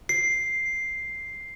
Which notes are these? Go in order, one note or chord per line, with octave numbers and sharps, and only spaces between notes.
C7